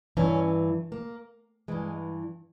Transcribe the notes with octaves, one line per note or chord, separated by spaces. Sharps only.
G2 E3 C#4
A#3
G2 E3 G#3